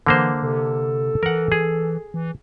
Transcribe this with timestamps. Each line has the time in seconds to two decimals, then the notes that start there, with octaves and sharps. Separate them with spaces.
0.06 D3 E3 A#3 C5
0.43 C3 A4
1.23 E3 A#4 F#5
1.52 G#4
2.14 E3